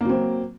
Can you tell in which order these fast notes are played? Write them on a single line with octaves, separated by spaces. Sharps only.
A#3 F#3 C4